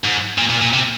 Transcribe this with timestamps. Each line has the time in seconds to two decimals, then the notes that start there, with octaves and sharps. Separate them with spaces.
0.05 G#2
0.38 A#2
0.50 A#2
0.62 A#2
0.73 C3